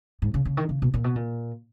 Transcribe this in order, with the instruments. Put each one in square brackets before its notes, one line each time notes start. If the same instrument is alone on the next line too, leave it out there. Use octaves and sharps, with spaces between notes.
[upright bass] G#2
C#3
C#3
D#3
C#3
B2
A#2
B2
A#2